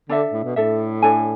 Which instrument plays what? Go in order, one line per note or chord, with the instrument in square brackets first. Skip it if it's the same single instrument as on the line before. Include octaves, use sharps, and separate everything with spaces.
[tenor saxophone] D3 [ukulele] D4 A4 E5
[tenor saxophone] A2
B2
[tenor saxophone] A2 [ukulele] D4 A4 E5
[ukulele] D4 A4 C#5 G#5